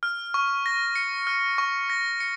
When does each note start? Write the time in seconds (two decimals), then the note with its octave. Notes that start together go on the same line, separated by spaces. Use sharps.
0.03 F6
0.34 C#6
0.66 A#6
0.96 C#7
1.27 F6
1.58 C#6
1.90 A#6
2.20 C#7